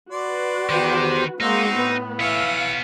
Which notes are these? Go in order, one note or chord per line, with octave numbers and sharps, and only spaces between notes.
F#4 B4 D5 C6
E2 D#3 G4 C5
G#3 A#3 C4 D#4 F#4 C6
A2 B3
E3 B3 C#5 E5 F5